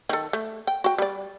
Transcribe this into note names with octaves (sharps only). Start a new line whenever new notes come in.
D#3 A4
A3
G5
F#4 G5
G3 D5